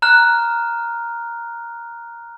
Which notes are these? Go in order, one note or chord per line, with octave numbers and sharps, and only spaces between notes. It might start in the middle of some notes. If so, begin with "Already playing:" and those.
A#5 F6 F#6